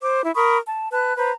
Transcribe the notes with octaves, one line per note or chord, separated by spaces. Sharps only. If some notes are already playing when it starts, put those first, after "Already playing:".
C5 D6
E4
A#4 B5 C#6 D#6
A5
B4 A5 F#6
B4 C5 A#5